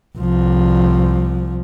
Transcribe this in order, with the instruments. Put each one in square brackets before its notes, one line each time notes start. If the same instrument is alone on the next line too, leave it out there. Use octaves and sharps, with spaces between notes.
[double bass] C2 F3